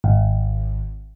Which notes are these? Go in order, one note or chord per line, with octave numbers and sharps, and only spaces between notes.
G#1